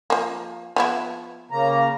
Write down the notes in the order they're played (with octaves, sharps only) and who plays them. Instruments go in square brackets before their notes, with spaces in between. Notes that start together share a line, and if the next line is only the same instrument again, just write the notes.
[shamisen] F3 A#3
F3 B3 E4
[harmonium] C#3 A#3 A#5